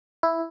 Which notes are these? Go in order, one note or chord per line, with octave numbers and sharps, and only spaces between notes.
E4